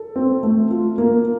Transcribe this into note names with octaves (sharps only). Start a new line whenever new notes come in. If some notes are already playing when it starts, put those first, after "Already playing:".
Already playing: A4
C4
A3
F4
A#3